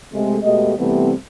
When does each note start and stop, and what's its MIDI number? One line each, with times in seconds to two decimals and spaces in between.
0.13 0.37 48
0.13 0.37 56
0.13 0.37 57
0.42 0.75 47
0.42 0.75 56
0.42 0.75 57
0.42 0.75 67
0.42 0.75 75
0.77 1.12 48
0.77 1.12 52
0.77 1.12 55
0.77 1.12 57
0.77 1.12 59
0.77 1.12 60